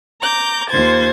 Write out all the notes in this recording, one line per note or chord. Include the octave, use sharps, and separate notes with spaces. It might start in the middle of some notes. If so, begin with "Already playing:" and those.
A#5 D6 G6
D#2 F4 C5 G#6 A6